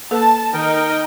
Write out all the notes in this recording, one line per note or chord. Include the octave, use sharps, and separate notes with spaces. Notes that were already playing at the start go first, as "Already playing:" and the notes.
A#3 A4 B4 A5
D#3 D#4 A#4 D#5 G5